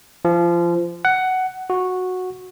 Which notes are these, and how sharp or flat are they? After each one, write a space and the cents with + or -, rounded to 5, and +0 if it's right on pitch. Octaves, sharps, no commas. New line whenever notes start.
F3 -25
F#5 +10
F#4 -10